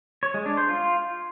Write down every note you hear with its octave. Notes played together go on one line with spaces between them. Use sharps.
C#5
G#3
D4
C5
F4